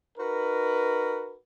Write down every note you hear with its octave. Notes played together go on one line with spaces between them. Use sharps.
D#4 F#4 A#4 B4